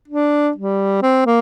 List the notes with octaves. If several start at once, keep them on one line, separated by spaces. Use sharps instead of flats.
D4
G3
C4
A#3